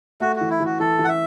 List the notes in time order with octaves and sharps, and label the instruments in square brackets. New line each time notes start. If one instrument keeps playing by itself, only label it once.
[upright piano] A3 [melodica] F#4
[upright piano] E3 [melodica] F#4
[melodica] E4
[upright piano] E3
[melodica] F#4
[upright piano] E3 [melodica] A4
[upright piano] E3
[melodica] F#5
E5